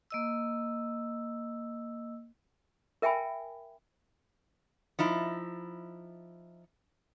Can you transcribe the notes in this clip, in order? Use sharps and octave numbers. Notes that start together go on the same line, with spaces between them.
A#3 D#5 E6
A#4 E5 G5 G#5 B5
F3 D#4 E4